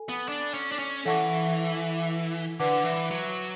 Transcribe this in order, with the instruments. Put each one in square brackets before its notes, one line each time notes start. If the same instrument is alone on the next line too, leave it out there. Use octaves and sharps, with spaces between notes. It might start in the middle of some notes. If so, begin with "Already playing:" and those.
Already playing: [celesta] A4 G#5
[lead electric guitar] B3
D4
C#4
D4
C#4
[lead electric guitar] E3 [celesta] A4 C#5 F#5 A5 C#6
[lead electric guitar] D3 [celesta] B4 F#5 A5 D6
[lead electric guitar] E3
F#3